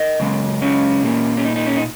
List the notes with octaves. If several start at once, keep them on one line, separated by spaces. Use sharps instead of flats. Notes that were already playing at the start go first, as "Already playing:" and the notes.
Already playing: A#4 D#5
F#2 C#3 G#3
C#4
A#2 A#3
C#4
D#4
D#4
C#4
D#4